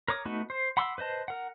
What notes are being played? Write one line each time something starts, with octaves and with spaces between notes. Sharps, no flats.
A#4 C#5 D6 D#6
A3 B3 D#4 F#4
C5
F#5 B5 C6 D6 E6
B4 C5 D#5 A5
A#4 F#5